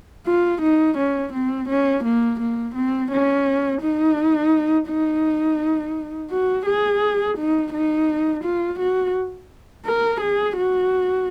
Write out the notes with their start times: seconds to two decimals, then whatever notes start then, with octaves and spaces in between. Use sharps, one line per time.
0.26 F4
0.61 D#4
0.97 C#4
1.33 C4
1.68 C#4
2.04 A#3
2.40 A#3
2.74 C4
3.11 C#4
3.81 D#4
4.88 D#4
6.30 F#4
6.66 G#4
7.37 D#4
7.73 D#4
8.43 F4
8.79 F#4
9.86 A#4
10.20 G#4
10.57 F#4